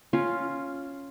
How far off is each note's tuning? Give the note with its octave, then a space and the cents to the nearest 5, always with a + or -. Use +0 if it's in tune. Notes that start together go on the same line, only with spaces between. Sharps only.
C#4 +0 F4 +0